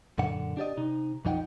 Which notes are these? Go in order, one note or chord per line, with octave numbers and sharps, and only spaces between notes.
F#2 A#2 D3 F#5
D4 G4 D5 D#5
C3 D#4
B1 F2 F3 D#4 F#5 G5